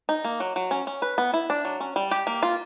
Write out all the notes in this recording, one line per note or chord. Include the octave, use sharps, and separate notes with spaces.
D#4
A#3
F#3
F#3
C#4
C#4
B4
B3
E4
D4
F#3
C#4
G3
G4
A#3
F4